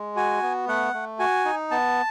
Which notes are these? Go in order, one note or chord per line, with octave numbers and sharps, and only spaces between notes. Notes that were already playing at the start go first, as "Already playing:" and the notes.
Already playing: G#3
F#4 G#5
B3
A3 F#5
A3
F#4 G#5
D#4
B3 A5